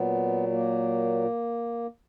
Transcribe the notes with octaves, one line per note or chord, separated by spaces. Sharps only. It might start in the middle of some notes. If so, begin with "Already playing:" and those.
Already playing: A#2 F#3 B3
A#3